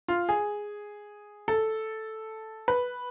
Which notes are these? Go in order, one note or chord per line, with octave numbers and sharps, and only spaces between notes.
F4
G#4
A4
B4